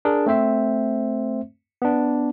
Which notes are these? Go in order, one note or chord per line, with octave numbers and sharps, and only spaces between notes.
D4 G#4 A#4
A3 C4 C5 E5
B3 D4